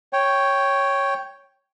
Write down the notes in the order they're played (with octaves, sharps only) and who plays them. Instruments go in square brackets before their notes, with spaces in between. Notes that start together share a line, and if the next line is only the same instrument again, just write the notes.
[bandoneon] C#5 G5